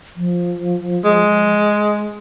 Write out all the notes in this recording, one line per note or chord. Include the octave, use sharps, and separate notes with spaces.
F3
G#3